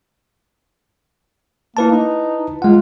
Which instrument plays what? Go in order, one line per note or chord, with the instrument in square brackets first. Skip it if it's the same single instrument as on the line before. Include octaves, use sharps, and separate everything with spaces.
[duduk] A#3 [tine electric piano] E4 B4 A5
[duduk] D#4
[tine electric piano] G#3 F#5 [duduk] F4